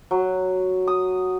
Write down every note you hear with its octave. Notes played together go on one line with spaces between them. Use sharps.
F#3
D#6